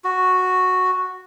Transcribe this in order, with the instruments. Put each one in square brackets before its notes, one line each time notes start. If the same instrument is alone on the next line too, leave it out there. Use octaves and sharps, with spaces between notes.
[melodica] F#4